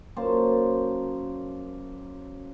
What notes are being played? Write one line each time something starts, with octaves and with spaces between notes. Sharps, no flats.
F#2 A#3 C5 A5